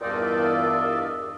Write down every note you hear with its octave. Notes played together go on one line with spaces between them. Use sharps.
E2 G2 A#2 C4 D#4 A#4 D5
F4 D#5 E5